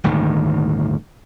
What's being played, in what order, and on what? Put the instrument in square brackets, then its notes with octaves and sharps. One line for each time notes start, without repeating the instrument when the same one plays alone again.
[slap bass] D#1 G#1 D2 D#3